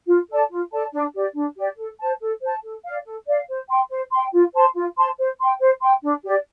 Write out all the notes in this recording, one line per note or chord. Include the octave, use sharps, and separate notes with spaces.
F4
A4 D5 A5
F4
A4 D5 A5
D4
G4 D5
D4
G4 D5
A4
C5 A5
A4
C5 A5
A4
D5 F5
A4
D5 F5
C5
G5 C6
C5
G5 C6
F4
C5 A5 C6
F4
C5 A5 C6
C5
G5 C6
C5
G5 C6
D4
G4 D5